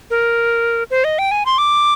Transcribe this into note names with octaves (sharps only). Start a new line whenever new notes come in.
A#4
C5
D#5
G5
G#5
C6
D6